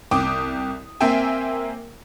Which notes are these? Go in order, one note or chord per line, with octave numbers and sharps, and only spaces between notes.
C2 G5 D6 D#6
A#3 C4 A#4 E5 G5 G#5